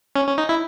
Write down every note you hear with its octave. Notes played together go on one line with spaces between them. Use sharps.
C#4
C#4
D#4
E4